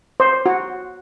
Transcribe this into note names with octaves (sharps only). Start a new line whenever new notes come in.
C5
F#4